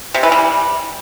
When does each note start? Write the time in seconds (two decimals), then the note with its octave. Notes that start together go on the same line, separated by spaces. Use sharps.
0.14 C3
0.23 E3
0.32 G3